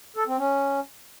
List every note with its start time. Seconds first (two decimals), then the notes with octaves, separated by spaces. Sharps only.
0.17 A4
0.27 C4
0.38 C#4